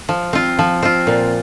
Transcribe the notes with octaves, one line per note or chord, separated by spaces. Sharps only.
F3
C4 F4
F3
C4 F4
A#2